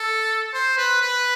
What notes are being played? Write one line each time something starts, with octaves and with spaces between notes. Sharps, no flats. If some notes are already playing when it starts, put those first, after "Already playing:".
Already playing: A4
C5
B4
B4